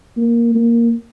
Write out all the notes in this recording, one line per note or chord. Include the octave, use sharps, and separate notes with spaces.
A#3
A#3